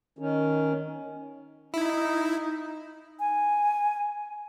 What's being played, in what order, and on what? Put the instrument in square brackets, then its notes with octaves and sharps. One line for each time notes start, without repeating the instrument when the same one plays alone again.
[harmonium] D#3 C#4
[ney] D#4 [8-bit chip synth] E4
[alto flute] G#5